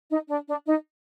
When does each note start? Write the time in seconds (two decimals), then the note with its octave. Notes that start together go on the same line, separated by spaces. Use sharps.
0.10 D#4
0.28 D4
0.46 D4
0.65 D#4